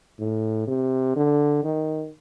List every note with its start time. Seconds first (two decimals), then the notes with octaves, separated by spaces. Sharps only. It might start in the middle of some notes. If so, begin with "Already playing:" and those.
0.19 A2
0.68 C3
1.16 D3
1.64 D#3